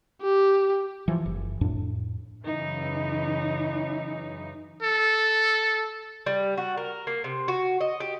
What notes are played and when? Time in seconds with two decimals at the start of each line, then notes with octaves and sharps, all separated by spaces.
0.22 G4
1.08 E3 F3
1.26 F#1
1.61 F2 A2 D4
2.45 F#2 C#3 E3 D#4
4.83 A4
6.26 G3
6.57 F#4
6.77 A#4
7.07 A#3
7.24 C3
7.48 F#4
7.80 D#5
8.00 G4